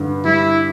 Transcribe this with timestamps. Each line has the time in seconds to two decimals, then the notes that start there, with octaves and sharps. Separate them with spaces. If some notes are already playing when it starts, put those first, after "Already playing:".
Already playing: G2 D3
0.25 G3 E4